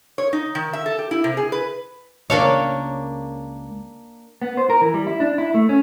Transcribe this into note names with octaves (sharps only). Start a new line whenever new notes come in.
C#5
D#4
D#3
E5
A4
G4
E4
C3
G#4
B4
C#2 A#3 D4 A#4 C#5 F5
B3
C5
A#4
E3
G3
E4
D4
E4
A3
C#4